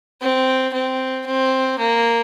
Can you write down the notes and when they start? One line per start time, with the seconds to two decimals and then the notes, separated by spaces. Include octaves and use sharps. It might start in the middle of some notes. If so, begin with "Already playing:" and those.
0.21 C4
0.73 C4
1.26 C4
1.78 A#3